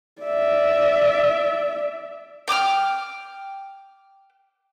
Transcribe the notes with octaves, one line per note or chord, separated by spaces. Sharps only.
D5 E5
G5 D6 D#6 F6